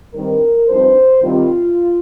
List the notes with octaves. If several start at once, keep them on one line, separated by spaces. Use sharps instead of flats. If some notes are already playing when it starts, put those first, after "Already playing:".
G2 D#3 G3 C4 D#4 A#4
G2 F3 C4 D#4 C5
C3 D#3 G3 C4 F4